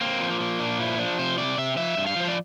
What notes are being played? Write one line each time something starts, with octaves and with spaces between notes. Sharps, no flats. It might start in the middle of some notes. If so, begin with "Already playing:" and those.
A#3 C4
F3
A#3
A#3
A#2 D4
F3 E4
F3 D4
C3 C5
C3 D5
C3 E5
F3 E5
G2
F5
F3 C5
D5